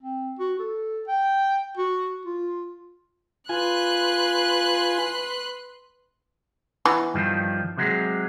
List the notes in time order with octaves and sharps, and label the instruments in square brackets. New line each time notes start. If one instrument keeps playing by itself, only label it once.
[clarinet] C4
F#4
A4
G5
F#4
F4
[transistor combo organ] F4 G#5 [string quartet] B4 C6 F#6
[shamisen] E3 B3
[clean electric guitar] G2 D#3 F3
C3 F#3 G#3